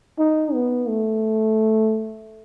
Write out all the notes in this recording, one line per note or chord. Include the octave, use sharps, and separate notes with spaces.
D#4
B3
A3